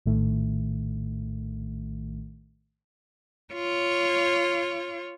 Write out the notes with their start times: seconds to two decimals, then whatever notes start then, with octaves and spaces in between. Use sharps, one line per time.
0.06 A#1 A2 D#3 A3
3.54 F4 C#5